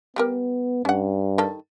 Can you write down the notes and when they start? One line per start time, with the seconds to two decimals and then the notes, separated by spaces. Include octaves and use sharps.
0.16 G3 B3 G4 A#4
0.85 G2 C#4 F#5
1.38 D#3 G3 A4